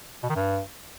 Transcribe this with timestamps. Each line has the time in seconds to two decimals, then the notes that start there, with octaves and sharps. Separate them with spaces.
0.23 B2
0.29 D#3
0.36 G2